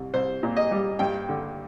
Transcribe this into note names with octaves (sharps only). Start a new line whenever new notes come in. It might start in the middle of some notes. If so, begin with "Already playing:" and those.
Already playing: C2
C2 C5
A#2
D#5
G3
G2 G5
D3